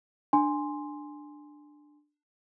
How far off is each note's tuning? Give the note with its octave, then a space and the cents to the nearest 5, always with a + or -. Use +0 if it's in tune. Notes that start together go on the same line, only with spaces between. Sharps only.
D4 +10 G#5 +0 C6 +0